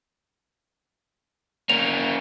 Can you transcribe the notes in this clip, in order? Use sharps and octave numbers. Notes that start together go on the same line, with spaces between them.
A#3 C#4 F7